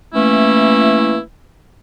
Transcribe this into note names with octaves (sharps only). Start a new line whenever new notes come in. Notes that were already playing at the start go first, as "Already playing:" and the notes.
E3 A3 A#3 C#4 E4